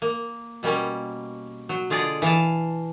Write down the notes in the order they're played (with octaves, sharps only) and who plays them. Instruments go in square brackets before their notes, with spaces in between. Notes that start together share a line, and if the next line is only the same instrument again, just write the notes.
[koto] A#3
B2 G3 A#3 C#4
F#3
D3 F4 G#4 D5 D#5
E3 F5 A5